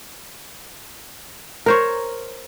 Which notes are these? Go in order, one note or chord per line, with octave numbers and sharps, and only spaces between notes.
A#4 C5 C#5